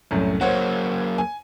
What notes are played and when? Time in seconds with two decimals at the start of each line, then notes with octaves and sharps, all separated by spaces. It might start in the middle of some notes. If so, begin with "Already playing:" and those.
0.11 C2 F#2 A2
0.41 F#3 A#3 C5 C#5 F#5
1.18 G#5